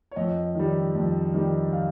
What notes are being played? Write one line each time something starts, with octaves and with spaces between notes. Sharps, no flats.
C#5
F2 D#5
D#3 G3
F2
D#3 G3
F5